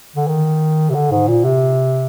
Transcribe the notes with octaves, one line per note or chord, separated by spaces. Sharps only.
D3
D#3
C3
D3
G#2
A#2
C3